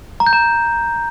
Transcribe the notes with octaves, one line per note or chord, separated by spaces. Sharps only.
A#5
G6
A#5